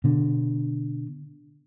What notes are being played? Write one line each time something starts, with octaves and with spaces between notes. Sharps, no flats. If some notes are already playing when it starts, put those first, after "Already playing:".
B2 D3